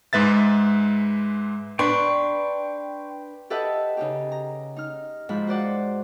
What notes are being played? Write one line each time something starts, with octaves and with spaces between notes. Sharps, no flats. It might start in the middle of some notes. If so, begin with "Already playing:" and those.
G#2 G#3 B4 E5 A6
D4 B4 G5 C6 C#6
G4 A4 B4 D#5 E5 F#5
C#3 D#4 G4
A#5
D#4 F6
G#2 F3 B5
F#4 C5 D5 F#5